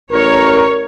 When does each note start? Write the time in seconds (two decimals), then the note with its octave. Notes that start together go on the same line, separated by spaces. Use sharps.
0.11 A1 A#4 C#5